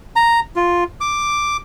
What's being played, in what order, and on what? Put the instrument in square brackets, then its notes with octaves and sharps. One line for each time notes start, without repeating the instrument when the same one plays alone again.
[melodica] A#5
F4
D6